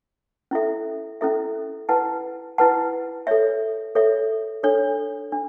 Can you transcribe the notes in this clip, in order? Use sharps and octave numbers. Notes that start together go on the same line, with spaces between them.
C#4 E4 A4 E5
C#4 E4 A4 E5
E4 B4 F#5 A5
E4 B4 F#5 A5
A4 C#5 E5
A4 C#5 E5
D4 A4 C#5
D4